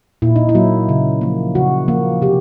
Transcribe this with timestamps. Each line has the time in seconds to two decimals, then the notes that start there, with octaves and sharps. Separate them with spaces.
0.22 A#2 E4
0.36 D#4
0.49 E4
0.55 F#3 A#3
0.89 C#3
1.21 F3 A#3
1.55 C#3 F#4
1.88 F3 A#3
2.22 C3 G4